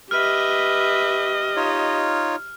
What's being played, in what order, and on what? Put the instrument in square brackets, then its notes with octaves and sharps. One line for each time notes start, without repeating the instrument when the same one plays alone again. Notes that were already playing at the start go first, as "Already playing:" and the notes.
[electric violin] G4 D#5 [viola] B4 E5 [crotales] F6
[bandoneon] D#4 F4 C#5